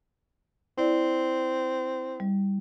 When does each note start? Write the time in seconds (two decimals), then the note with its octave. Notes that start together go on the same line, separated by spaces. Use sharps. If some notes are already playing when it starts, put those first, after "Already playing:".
0.78 C4 E4 D5
2.20 G3